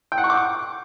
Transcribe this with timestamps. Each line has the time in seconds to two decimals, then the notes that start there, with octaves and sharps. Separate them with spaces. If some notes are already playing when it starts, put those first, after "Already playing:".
0.12 G5
0.18 F#5
0.24 C#6
0.30 D6